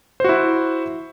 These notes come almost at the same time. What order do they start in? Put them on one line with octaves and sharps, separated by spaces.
C5 F#4 E4